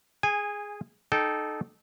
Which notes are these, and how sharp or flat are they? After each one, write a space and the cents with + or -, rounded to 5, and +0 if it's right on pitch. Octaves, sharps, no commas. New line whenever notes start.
G#4 +0 G#5 -20
D#4 -25 A4 -20 G5 -10